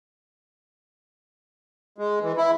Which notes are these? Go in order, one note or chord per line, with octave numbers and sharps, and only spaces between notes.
G#3
E3
E4